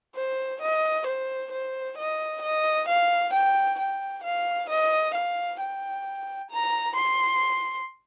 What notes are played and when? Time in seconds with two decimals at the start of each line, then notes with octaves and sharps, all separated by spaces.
0.16 C5
0.62 D#5
1.07 C5
1.52 C5
1.97 D#5
2.42 D#5
2.88 F5
3.34 G5
3.79 G5
4.24 F5
4.70 D#5
5.15 F5
5.60 G5
6.51 A#5
6.96 C6